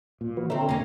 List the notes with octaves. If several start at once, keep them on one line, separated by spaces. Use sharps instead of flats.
A#2
E3 F#4 B4
D3 C4 A4 C#5 E5 A#5
F2 C3 A#3 C#4